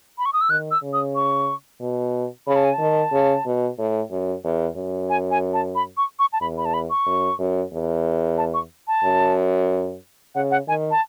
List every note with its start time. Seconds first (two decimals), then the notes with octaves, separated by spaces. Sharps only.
0.18 B5
0.26 C#6
0.33 D#6
0.41 E6
0.49 D#3 F#6
0.71 E6
0.82 C#3
0.93 D#6
1.15 C#6
1.81 B2
2.47 C#3 B5
2.56 A5
2.65 G#5
2.74 A5
2.79 D#3
3.12 C#3
3.46 B2
3.78 A2
4.11 F#2
4.44 E2
4.76 F#2
5.10 G#5
5.31 G#5
5.54 A5
5.75 B5
5.97 C#6
6.19 C#6
6.33 A5
6.41 E2 B5
6.58 B5
6.65 A5
6.74 B5
6.90 C#6
7.06 F#2
7.39 F#2
7.73 E2
8.38 A5
8.54 C#6
8.88 A5
9.04 F#2
10.35 C#3 F#5
10.51 F#5
10.68 D#3 G#5
10.91 A5